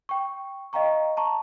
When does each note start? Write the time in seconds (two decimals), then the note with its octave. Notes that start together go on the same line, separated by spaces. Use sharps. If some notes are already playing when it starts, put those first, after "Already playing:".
0.09 G5 C#6
0.73 D#5 F5 G5 A#5 C#6
1.17 A5 A#5 C#6